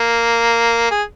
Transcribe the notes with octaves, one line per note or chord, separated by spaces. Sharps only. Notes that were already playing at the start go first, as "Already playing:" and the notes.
Already playing: A#3
G#4